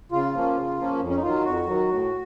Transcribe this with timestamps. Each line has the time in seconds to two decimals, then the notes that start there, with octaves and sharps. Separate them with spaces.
0.12 C#3 F4
0.34 F3 A#3 C#4
0.56 C#3
0.78 F3 A#3 C#4
1.00 F2
1.08 C#4
1.15 D#4
1.22 D#3 F#3 F4
1.44 F2 F#4
1.67 D#3 F#3
1.89 A2